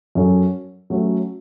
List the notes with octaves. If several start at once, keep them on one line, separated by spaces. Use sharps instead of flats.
F#2 F#3 C#4 A4 C#5
F#3 A3 C#4 A4